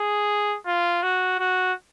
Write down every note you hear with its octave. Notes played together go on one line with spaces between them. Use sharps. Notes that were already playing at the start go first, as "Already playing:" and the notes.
Already playing: G#4
F4
F#4
F#4